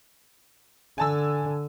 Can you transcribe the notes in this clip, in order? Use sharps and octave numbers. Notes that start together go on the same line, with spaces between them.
D3 G#5 A5 E6